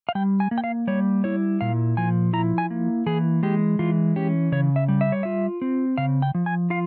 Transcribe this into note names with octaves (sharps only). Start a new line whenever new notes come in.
F5
G3 G5
G#5
A#3
G5
F5
G3 C#5
E4 C#5
A#2 F5
F3 G#5
E4 A#5
G#5
A#3
E3 G#4
G#3 G4
E3 F4
C#4 G4
C#3 C#5
E5
G3
E5
C#5
F4 E5
C4
C#3 F5
G5
F3
G#5
F4 F5